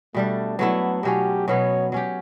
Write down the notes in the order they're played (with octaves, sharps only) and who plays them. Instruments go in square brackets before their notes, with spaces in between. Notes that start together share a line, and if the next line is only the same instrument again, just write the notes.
[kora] B2 G3 D4 [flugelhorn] A3
[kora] F#3 A3 E4 [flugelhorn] B3
[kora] B2 F#3 C#4 [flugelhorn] G4
[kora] B2 F#3 B3 [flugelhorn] C#5
[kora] F#3 C#4 G4